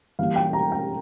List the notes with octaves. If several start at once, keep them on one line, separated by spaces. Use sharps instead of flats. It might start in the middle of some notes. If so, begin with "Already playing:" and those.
E3 G3 A#3 F5
G5
A#5
G5